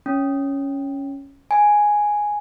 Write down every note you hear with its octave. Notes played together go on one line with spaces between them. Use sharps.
C#4
G#5